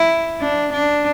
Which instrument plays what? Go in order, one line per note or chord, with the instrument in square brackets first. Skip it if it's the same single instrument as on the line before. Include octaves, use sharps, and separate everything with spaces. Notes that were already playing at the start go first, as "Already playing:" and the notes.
Already playing: [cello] E4
D4
D4